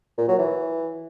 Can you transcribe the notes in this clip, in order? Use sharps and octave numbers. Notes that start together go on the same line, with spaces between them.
A#2
F#3
E3